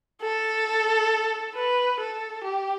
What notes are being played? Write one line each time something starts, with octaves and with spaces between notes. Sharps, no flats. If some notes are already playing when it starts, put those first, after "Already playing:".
A4
B4
A4
G4